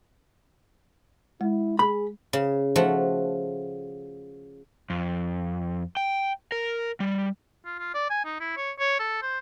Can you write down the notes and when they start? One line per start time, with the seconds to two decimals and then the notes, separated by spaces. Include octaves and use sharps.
1.41 G#3 E4
1.79 G#4 B5
2.33 C#3
2.76 F3 A3 F#4
4.90 F2
5.97 G5
6.52 A#4
7.00 G3
7.66 F4
7.79 F4
7.95 D5
8.10 G#5
8.25 D#4
8.40 E4
8.57 C#5
8.79 C#5
8.99 A4
9.22 C5